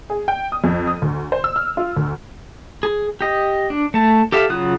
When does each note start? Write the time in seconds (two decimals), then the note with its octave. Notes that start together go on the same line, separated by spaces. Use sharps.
0.10 G#4
0.28 G5
0.52 D#6
0.64 F2
0.87 D#6
1.02 D2
1.32 C5
1.44 E6
1.56 F6
1.77 F4
1.96 D2
2.83 G#4
3.21 G4 D#5
3.70 D4
3.94 A3 A5
4.32 G4 A4 E5 F5
4.49 C#3 F#3 F4 D#6 F#6